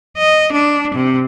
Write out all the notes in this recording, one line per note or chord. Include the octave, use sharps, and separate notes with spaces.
D#5
D4
C3